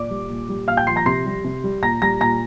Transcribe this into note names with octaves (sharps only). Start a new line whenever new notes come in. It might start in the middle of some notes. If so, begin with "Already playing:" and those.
Already playing: A#2 D5 D6
G3
A#2
G3
A#2 F5 F6
G5 G6
F3 C6 C7
A#5 A#6
C3 C6 C7
G3
C3
G3
A#2 A#5 A#6
G3 A#5 A#6
A#2 A#5 A#6